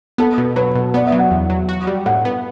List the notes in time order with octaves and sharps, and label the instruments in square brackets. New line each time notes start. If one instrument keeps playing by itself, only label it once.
[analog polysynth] B3 [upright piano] A4
[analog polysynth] B2
[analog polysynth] F#3 [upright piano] B4
[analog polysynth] B2
[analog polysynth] B3 [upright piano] D5
[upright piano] E5
[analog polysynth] F#3
[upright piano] F#5
[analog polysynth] E2
F#3
F#4
G3
[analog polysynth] A2 [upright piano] F#5
[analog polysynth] B3